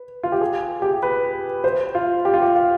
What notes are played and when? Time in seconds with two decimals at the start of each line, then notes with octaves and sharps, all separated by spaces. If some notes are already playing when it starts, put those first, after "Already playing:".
Already playing: B4
0.23 F4
0.32 G4
0.41 G#4
0.82 G4
1.03 B4
1.64 C5
1.95 F4
2.25 G4
2.34 F4
2.42 G4
2.55 F5